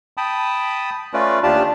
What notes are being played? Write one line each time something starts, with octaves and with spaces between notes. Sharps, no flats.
G5 A5 B5 D#6
A3 C#4 F4 B4 D5
D#2 D4 F4 G4 D5 A5